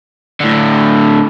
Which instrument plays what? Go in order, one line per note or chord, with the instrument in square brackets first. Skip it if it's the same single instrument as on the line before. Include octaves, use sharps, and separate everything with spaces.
[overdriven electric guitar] A2 D3